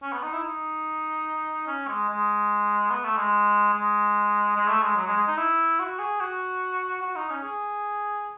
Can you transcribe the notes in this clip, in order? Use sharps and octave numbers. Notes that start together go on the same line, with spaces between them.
C#4
B3
D#4
E4
D#4
C#4
G#3
G#3
B3
A3
G#3
G#3
G#3
A3
G#3
F#3
G#3
G#3
D#4
E4
F#4
G#4
F#4
F#4
D#4
C#4
G#4